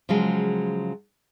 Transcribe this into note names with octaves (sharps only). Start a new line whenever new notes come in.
C#3 F3 F#3 G#3